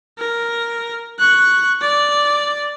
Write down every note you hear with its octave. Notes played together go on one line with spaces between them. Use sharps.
A#4
C#6 F#6
D5